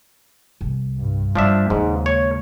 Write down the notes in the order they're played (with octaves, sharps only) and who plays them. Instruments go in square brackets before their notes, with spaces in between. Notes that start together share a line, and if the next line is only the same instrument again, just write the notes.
[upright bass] C2
[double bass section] G2
[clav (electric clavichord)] F3 D4 E5 [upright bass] G3
[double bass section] D#2 C#3 [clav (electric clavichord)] G#2 [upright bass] G#3 D#4
[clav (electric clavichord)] C#5